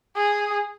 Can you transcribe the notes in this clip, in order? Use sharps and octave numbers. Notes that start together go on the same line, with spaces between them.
G#4